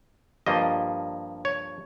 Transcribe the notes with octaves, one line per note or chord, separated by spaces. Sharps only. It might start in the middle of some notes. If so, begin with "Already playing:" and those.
G2 F3 A#3 D#5
C#5